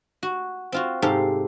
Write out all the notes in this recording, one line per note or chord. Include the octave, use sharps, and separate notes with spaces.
F#4
C4 F4 F#4
G#2 C3 G4 A4 F5